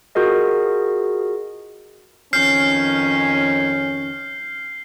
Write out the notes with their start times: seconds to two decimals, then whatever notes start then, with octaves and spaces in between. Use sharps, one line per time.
0.15 F4 F#4 G#4 A#4 D#5
2.33 F2 D#3 C#4 F6 G6 C7